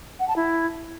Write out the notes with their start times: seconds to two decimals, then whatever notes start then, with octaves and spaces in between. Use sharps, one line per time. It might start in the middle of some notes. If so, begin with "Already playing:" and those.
0.20 F#5
0.28 A5
0.36 E4